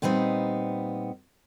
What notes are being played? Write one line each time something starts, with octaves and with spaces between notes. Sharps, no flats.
A#2 G3 B3 C4 D#4